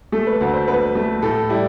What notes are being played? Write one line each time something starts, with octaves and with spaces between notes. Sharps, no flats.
A3 A4
B4
D2
C5
D2 B4
A3
A2 A4
G3 E4